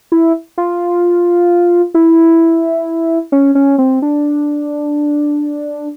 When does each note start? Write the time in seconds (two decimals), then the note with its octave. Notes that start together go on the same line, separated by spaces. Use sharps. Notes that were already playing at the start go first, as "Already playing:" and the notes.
0.12 E4
0.58 F4
1.94 E4
3.32 C#4
3.55 C#4
3.78 C4
4.02 D4